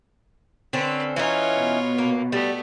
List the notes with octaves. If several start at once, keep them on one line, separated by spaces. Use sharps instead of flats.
D3 C4 C#4 B4
E3 C#4 D#4 F4 C#5
B2
A#3
G3 A3 B3